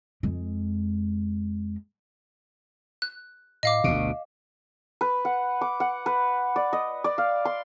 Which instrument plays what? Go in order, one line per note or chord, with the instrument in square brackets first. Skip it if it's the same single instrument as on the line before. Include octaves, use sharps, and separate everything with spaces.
[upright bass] F2 G#3
[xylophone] F#6
[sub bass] A2 [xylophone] D#5 F5 D6
[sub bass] G1 [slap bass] D2 B2
[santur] B4
F#5
D6
F#5
B4
D5
D#5
D5
F5
C6